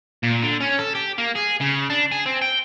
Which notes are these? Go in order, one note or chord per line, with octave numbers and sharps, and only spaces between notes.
A#2
D3
C#4
A4
G4
A#3
G#4
C#3
D4
G#4
C4
G5